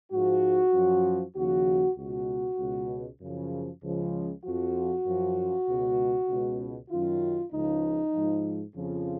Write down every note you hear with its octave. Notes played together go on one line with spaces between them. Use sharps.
G#2 F3 F#4
F#2 F3
D#2 C#3 F3 F#4
C#2 B2 F#4
C#2 B2
F#2 C#3 F3
C#2 C#3 F3
F2 F3 F#4
F#2 F3
C#2 B2
C#2 B2
F#2 D#3 F4
C#2 C#3 F3 D#4
G#2 F3
F2 C#3 F3 F4